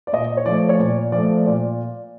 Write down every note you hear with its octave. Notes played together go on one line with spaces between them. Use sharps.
D5
A#2 D#5
C#5
F3 A3 D5
C#5
A#2 D5
F3 D5
A3
A#2 D5